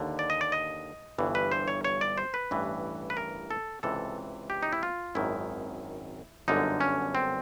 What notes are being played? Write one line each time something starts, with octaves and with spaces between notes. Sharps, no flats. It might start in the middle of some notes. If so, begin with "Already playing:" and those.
Already playing: D#2 D3
D5
D#5
D5
D#5
G1 G2 E3
B4
C5
C#5
C#5
D5
C5
B4
A1 G2 E3
B4
A#4
A4
C#2 C3 E3 A4
G4
D#4
E4
F4
G#1 F#2 D#3 E4
G1 F#2 D3 D#4
C#4
C4